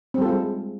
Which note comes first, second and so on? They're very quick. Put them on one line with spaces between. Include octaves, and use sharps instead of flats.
C4 G3 A4 F4 G#3